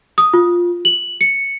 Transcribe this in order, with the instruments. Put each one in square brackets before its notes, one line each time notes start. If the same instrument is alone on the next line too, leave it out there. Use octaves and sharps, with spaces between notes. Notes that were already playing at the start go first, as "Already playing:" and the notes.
[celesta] D#6
F4
F#7
C#7